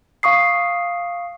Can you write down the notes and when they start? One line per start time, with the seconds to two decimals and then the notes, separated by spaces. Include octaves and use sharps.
0.23 F5 C#6 D#6 C7